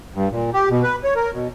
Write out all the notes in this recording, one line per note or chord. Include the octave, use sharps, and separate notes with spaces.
G2
A#2
G4
B2
B4
C#5
A#4
B2